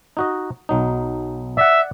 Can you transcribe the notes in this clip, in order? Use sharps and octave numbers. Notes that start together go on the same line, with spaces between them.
D#4 F#4 D#5
B1 F#3 D#4
D5 E5 F#5